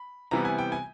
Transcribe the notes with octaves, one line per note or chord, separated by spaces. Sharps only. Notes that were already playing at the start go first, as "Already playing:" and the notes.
Already playing: B5
C3 E3 G3 B3 A#5
G#5
G5
G#5